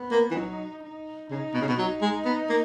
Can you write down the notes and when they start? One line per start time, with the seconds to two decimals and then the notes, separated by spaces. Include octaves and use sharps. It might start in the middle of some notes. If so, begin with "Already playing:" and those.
Already playing: B3
0.11 A#3
0.31 E3
0.35 F#3 D#4
0.83 D#4
1.30 C#3 D#4
1.54 B2
1.61 C#3
1.68 B2
1.78 F#3 D#4
2.02 G#3
2.25 B3
2.49 A#3